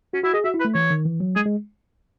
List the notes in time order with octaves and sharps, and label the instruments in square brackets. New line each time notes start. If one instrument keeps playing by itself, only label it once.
[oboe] C#4 [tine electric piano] F#4
[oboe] E4 [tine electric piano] F#4
[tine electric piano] G#4 [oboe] D#5
[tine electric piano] F#4 [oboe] E5
[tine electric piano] E4
[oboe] B4
[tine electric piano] A3
[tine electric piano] E3 [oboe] C#5
[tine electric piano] D#3
E3
F#3
[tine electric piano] G#3 [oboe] G#4
[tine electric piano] G#3